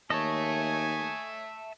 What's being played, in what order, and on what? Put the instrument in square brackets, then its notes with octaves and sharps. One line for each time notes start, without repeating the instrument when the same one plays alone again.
[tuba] D#2 [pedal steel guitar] C#5 D#5 [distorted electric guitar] E5 A5 [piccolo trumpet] G#5